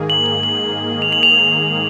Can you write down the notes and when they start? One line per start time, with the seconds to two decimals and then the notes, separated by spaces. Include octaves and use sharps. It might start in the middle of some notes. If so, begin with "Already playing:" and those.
Already playing: G#2 D#3 A#3 G#4
0.10 F#7
0.26 F#7
0.43 F#7
1.02 F7
1.12 F#7
1.23 F7